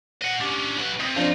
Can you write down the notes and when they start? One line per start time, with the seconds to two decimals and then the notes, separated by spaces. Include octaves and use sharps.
0.22 D#5 F#5
0.41 C#4 D4 G4
0.78 F#3 B4
1.00 C3 D#6
1.16 F3 C4 D4 D#4 F4